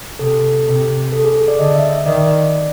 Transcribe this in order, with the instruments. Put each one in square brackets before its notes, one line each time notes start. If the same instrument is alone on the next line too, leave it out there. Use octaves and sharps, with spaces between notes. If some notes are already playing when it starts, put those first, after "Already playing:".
[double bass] C3 [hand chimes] A4
[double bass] C3
[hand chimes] A4
G#4
G#4
D5
[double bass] D3 [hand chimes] D#5
[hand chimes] E5
E5
[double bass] D#3 [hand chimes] D5